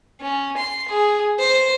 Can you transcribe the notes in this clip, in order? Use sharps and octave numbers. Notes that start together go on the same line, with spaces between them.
C#4
C6
G#4
C5